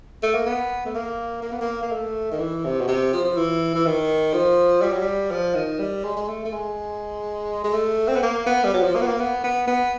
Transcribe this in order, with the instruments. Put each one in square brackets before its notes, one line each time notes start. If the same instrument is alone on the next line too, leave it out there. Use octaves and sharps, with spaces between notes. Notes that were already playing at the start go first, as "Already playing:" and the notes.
[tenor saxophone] A3
A#3
B3
A3
A#3
A#3
B3
A#3
A#3
A3
D#3
E3
C3
B2
C3
F3
F3
E3
E3
D#3
F3
G3
F#3
G3
F3
D#3
G3
G#3
G#3
A3
A3
G#3
G#3
A3
C4
B3
A#3
B3
G3
F#3
F3
A#3
B3
A#3
B3
B3
B3